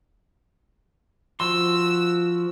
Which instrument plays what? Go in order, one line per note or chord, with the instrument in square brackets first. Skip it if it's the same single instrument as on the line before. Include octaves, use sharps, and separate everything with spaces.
[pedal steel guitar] F3 F#4 C6 [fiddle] E6